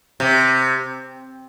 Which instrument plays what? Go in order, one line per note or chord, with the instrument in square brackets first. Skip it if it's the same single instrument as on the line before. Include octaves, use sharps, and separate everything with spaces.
[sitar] C3